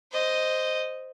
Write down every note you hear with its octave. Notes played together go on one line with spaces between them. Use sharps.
C5 D#5